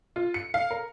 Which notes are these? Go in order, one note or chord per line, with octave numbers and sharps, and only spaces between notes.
F4
C#7
F5
A#4